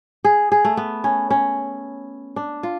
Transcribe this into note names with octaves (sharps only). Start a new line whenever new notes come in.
G#4
G#4
A3
B3
C#4
C#4
D4
F4